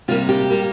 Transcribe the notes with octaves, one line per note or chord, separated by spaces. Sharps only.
C3 G3 A#3 F4
G4
G3 A#3